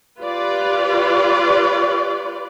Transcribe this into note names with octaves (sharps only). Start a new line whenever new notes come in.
F4 G4 B4 D5